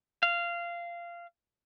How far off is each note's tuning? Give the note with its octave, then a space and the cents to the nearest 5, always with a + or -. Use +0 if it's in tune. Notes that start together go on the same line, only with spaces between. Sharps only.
F5 -15